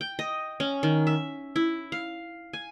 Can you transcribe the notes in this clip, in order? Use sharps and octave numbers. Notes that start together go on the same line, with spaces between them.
G5
D#5
C#4
D#3
E5
E4
F5
G#5